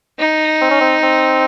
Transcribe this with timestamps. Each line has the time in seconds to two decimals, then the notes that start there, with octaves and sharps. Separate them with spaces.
0.19 D#4
0.61 C4
0.71 C#4
0.81 C4
1.03 C4